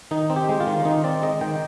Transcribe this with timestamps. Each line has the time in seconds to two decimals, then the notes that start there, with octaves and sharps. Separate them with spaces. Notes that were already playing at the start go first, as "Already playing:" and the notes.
0.11 D#3 D#4
0.30 C4
0.36 G4
0.49 G#3
0.60 F4
0.67 D#3
0.85 D#3 D#4
1.04 C4 D5
1.22 G#3 D#5
1.41 D#3 G5